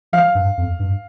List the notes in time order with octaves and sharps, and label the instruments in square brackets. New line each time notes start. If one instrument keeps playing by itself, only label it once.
[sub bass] F3 [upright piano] F5
[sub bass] G2
F2
G2